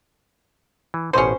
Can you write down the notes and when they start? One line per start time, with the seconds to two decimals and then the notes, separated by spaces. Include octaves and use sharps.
0.94 E3
1.13 A1 B2 C#4 G#4 C5